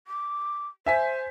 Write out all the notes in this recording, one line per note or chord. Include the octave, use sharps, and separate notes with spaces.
D6
C5 E5 G#5 B6